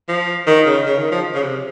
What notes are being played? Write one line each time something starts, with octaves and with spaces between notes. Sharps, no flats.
F3
D#3
C#3
C#3
D#3
F3
C#3
C3